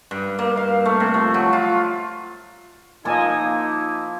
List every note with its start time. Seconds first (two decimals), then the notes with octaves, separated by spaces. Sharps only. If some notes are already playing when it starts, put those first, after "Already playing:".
0.11 G2
0.39 A#3
0.57 F5
0.85 A3
1.00 C3
1.14 F3
1.34 F#3
1.53 F4
3.05 F3 A#3 D#4 E4 D#5 G#5 A5